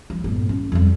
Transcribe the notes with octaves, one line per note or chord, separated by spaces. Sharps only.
F3
G1 A#2
C#4
F2 G3